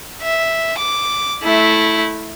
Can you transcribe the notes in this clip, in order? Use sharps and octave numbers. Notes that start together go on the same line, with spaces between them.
E5
D6
A3 E4